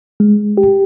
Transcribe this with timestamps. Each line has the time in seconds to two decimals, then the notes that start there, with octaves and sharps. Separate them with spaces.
0.20 G#3
0.58 G4